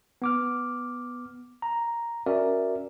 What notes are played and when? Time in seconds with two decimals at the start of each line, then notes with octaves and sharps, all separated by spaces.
0.22 B3 D6 F6
1.62 A#5
2.26 C#4 F#4 A#4 D5 E5